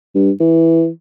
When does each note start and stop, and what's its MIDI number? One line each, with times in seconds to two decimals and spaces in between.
0.15 0.31 43
0.40 0.88 52